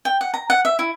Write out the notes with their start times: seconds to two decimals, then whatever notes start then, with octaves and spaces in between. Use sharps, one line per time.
0.05 G5
0.21 F#5
0.34 A#5
0.50 F#5
0.65 E5
0.79 E4